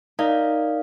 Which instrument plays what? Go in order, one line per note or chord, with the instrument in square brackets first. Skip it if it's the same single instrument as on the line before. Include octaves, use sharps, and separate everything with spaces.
[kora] D#4 [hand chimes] A#4 D5 F5